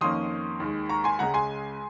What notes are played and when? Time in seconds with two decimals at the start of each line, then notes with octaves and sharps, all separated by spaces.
0.01 F2 D#3 A#3 C#4 C6 D#6
0.60 D#2 D#3 G#3
0.89 A#5 C#6
1.04 G#5 C6
1.19 C#2 C#3 G#3 F#5 A#5
1.34 G#5 C6